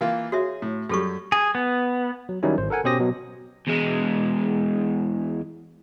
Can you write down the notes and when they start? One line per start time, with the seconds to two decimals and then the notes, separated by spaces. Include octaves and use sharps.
0.01 E3 A#3 F4
0.32 F#4 G#4 C#5 E5
0.62 A2
0.89 F#2 G3 G#4 A4 C#6
1.32 G#4
1.55 B3
2.29 F#3
2.43 D#3 F#3 G3 C#4 D#4 E4
2.58 G#1 C5
2.70 A4 A#4 F#5 G#5
2.84 B2 C#4 G4 C5 D#6 A#6
3.00 B2 F#3
3.68 E2 G#3